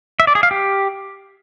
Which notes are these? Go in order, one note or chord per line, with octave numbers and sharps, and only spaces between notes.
E5
D5
G#4
F5
G4